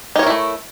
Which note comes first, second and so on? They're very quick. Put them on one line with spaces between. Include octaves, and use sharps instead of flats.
D#4 C#5 A#4 E4 A3